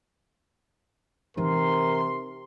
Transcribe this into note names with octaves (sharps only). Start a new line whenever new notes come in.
C3 E3 D#4 A#4 C6